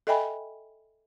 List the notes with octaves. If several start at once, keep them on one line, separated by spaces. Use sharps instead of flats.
A4 D#5 E5 G5 G#5 B5